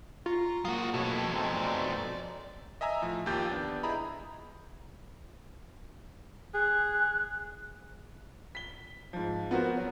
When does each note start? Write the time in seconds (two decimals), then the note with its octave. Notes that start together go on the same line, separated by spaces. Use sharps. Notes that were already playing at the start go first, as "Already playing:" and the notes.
0.26 F4 A#5 C#6
0.65 F#3 A#3 F4 F#4 D#6
0.94 F2 B2 A3 C#5
1.32 G#3 C4 D#4
1.55 D5
2.81 D#5 E5 G#5 A#5 E6
3.02 A2 F3
3.26 D#2 A#3 F4 G4 G6 A6
3.50 B3 D4
3.83 E4 G#4 D#5 A#5 B5
6.54 G#4 F#6
8.55 B6 G7
9.13 G#2 F3
9.51 B3 F#4 A#4 C5
9.77 F#3 B3